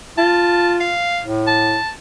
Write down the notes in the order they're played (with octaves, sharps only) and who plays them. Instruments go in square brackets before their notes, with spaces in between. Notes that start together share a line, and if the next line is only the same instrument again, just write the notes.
[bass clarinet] F4 [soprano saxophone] A5
[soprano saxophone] F5
[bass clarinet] A2
[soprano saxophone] A5